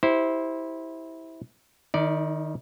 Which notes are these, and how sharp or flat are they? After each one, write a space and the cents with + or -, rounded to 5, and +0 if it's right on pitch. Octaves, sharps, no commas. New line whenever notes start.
E4 -20 G4 +0 C5 +0
D#3 -15 D#4 +45 D5 +0